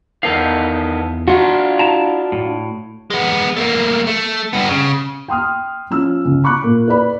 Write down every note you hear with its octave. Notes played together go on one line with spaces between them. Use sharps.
E2 D#3 B3 A4 F5
D4 F4 F#4
E4 A5 A#5
A2
G#3 B3
A3 A#3
A3
G2 B3
C#3
G5 C6 D#6 F6
F3 C#4 E6
C#2
B5 C#6 D6 F#6
A#2
B4 D5 B5